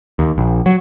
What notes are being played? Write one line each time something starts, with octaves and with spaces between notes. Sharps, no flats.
D#2
A#1
F#3